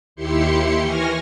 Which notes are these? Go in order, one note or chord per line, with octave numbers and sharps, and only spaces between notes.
D#2 E4 G4 C6 C#7
E3 G#5 C#6 F6 A#6